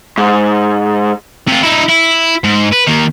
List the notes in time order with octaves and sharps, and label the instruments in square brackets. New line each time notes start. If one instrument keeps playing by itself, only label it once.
[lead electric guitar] G#2
[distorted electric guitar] C3 F4
D#4 E4
E4
G#2
B4
D#3 A#3